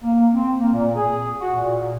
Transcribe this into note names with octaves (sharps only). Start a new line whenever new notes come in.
A#3
C4
A#3
A#2
G#4
F#4
A#2